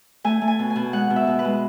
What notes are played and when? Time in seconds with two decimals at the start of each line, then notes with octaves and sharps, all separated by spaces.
0.24 A3 G#5
0.41 A3
0.48 G#5
0.59 B2
0.70 G#5
0.76 B2
0.93 G#3 F#5
1.10 B2
1.16 E5
1.27 B2
1.39 B4
1.45 G#3